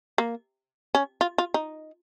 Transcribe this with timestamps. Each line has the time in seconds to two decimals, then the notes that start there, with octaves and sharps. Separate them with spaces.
0.18 A#3
0.95 C#4
1.21 F4
1.38 F4
1.54 D#4